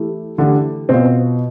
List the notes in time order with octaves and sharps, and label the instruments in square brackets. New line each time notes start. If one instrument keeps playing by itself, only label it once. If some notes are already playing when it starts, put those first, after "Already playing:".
Already playing: [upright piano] E3 A3 E4 G4
[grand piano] D3 [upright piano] E3 A3 E4 G4
[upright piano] B2 B3 F4 [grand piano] C4